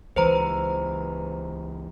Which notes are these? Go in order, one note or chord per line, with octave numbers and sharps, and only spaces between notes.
C#2 E3 B4 C5 A#5